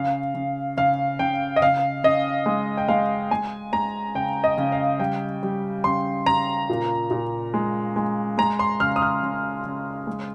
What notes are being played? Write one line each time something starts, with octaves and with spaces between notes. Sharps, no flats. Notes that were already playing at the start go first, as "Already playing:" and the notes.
Already playing: C#3 F5
C#3
C#3 F5
C#3 G5
D#5
C#3 F5
C#3 D#5
G#3
G5
G#3 F5
G#3 G#5
G#3 A#5
C#3 G5
D#5
C#3
F5
G3 G5
G3
C#3 C6
C#3 A#5
A#2
A#2
G#3
G#3
G#3 A#5
C6
C#3 F6
D#6
F6
C#3
C#3
G#3